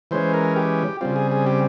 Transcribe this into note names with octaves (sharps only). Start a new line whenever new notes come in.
E3 G#3 C#4 C5
A#4
G4
C#3 G3 C4 F4
G#4
G#4
G4